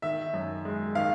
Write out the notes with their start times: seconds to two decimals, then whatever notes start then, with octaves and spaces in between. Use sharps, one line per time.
0.02 D#3 E5
0.34 F#2
0.65 G#3
0.95 D#3 F5